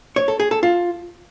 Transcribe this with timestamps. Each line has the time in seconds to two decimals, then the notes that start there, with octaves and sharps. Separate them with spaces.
0.16 C#5
0.28 A4
0.40 G#4
0.51 A4
0.63 F4